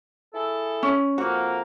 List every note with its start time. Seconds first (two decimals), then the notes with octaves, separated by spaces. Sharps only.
0.34 E4 G#4 A4
0.83 C#4
1.18 F2 A#3 F#4